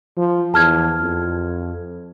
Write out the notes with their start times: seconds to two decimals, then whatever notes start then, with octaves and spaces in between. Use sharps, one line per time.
0.17 F3
0.54 E2 A5 F6 G#6
1.01 F2